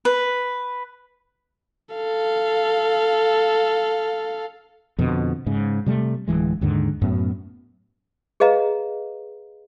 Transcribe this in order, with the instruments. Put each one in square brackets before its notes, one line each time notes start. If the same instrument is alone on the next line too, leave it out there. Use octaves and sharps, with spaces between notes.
[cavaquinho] B4
[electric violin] A4 F5
[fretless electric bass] F2 B2 D3
G#2 C#3
C3 G3 A3
D1 D2 E3 G#3
D#2 G#2 D3 D#3
F#2 A2 B3
[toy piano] G#4 B4 D#5 F5 A#5